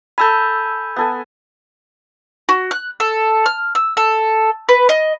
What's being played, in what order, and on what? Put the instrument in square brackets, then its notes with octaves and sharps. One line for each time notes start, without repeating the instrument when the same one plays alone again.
[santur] A4 G#5 [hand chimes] B5 E6 G6
[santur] B3 A4 G#5
[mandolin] F#4
F#6
A4
F6
E6
A4
B4
D#5